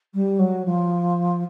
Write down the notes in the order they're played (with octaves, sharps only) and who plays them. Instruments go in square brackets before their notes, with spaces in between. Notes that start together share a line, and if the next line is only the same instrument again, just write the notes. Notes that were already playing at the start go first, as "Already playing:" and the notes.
[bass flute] G3
F#3
F3